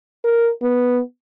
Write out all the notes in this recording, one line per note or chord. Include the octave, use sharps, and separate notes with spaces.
A#4
B3